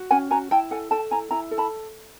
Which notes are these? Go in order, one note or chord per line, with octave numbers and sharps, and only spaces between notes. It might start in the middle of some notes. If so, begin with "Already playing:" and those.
Already playing: F#4
C#4 F#5 G#5
F#4 G#5 A#5
E4 G5 A5
A4 F#5 G#5
A4 G5 A5
E4 G#5 A#5
E4 G#5 A#5
A4
A5 B5